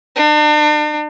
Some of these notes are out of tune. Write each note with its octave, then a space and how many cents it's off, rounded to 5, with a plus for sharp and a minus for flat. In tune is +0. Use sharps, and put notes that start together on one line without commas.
D4 +40